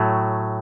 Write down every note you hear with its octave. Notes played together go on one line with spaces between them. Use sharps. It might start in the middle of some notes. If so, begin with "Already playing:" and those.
Already playing: A2 F#3 A3